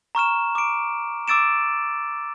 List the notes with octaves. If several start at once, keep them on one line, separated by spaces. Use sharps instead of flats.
A#5 C#6 F6 E7
D6 D7
D6 E6 A6 D7 E7